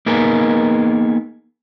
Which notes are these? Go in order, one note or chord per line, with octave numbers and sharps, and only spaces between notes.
A#3 B3 D#4 G#4 A#4